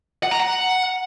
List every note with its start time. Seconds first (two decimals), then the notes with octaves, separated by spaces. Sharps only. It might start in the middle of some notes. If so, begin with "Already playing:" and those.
0.23 F#5
0.31 A#5
0.40 F#5